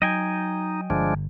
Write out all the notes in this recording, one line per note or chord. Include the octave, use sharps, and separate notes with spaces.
F#3 D#4 D#5 G5 G#5
G1 F3 G#3 D4